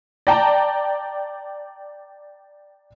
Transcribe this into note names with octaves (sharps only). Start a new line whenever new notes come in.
D5 G5 A5 A#5